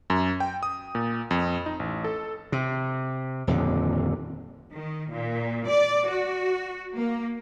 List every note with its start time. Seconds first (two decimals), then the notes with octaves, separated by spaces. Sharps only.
0.10 F#2
0.40 G5
0.63 D#6
0.95 A#2
1.31 F2
1.66 D#4
1.80 A1
2.04 A4
2.52 C3
3.47 D#1 F2 D3
4.73 D#3
5.11 A#2
5.67 D5
6.08 F#4
6.96 A#3